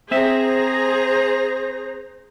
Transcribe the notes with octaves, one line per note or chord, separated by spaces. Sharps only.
C4 G#4 C5 E5 A#5